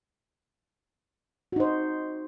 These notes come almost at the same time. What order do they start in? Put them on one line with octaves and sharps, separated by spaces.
F#4 D#4 C5